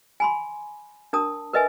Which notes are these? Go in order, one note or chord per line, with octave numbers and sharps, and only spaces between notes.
G#5 B5 C6
D4 A#4 A5 D#6
A#4 B4 D#5 E5 G#5